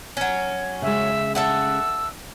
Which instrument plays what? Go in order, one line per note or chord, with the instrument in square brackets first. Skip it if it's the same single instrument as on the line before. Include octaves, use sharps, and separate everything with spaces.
[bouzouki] F#3 C#4
[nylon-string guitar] C#3 G#3 [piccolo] E5
[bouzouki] A4 E5 F#5 [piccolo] E6